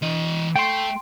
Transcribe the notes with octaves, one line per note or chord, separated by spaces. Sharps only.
E3 D#5
A3 G5 C6